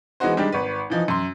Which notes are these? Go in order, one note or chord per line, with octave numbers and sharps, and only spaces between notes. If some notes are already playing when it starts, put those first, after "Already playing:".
E3 G#3 B3 D#4 F#4 C5
D#3 G3 G#3 D4 G4
G#1 B4
E3 F3 D#4
F#2 C6